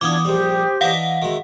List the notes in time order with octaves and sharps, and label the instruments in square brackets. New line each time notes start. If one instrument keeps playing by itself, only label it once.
[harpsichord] E3 B3 F5 [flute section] D4 F4 G#6 [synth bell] D6 D#6
[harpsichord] A#1 G3 [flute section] G4 C5
[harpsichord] E3 D4 D#4 [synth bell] F5 F#5
[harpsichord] D#3 G#3 [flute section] F#4 E5